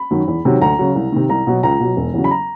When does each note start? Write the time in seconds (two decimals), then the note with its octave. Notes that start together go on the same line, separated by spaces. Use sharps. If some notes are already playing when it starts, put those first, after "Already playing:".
Already playing: B5
0.11 F#2 D#3 F#3
0.28 E2
0.45 C3 D#3 F#3
0.61 D2 A#5
0.79 C#3 F#3
0.96 C2
1.12 C3 D#3
1.29 C2 A#5
1.47 B2 F#3
1.63 C#2 A#5
1.80 B2 F#3
1.97 E1
2.14 E2 C#3 F#3
2.24 B5
2.31 A#5